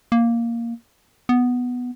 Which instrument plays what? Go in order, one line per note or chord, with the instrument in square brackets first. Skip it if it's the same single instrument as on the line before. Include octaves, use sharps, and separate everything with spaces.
[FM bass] A#3
B3